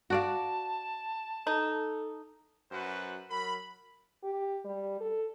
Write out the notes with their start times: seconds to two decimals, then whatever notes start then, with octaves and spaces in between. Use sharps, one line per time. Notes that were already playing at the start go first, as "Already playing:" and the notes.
0.10 F#4 D5 F5 A5
1.47 D#4 A4
2.71 F#2 F#4 B4 C5 F#5
3.30 F#3 A#4 B5
4.24 G4
4.65 G3
5.01 A4